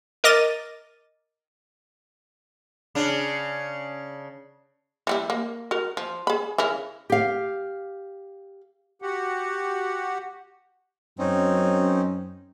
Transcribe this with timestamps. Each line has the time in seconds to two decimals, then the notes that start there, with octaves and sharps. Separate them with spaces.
0.24 A#4 D#5 D6 A6 D#7
2.95 C#3 D4
5.07 E3 G3 E4
5.30 A#3
5.71 F#4 A#4
5.97 F3
6.27 G#4 B5
6.58 C#3 E4 A#4
7.10 G4 F5
9.02 F#4 G4 F#5
11.19 F#2 C4 C#4 D#4